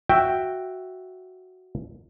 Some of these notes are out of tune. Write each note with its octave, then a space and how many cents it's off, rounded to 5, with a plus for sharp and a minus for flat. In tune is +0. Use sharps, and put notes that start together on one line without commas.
F#4 +0 E5 +0 G5 +0